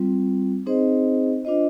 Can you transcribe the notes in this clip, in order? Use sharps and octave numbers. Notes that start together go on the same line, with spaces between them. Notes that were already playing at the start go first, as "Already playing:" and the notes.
Already playing: G3 C4 F4
C4 D#4 G#4 C5 D#5
D4 F4 C5 D#5